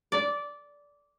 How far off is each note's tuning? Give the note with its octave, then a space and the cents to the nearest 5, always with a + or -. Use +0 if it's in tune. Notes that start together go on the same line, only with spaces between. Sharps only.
D5 -15